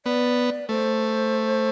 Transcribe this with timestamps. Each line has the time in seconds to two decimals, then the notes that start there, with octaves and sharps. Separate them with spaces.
0.06 B3 D5
0.69 A3 C5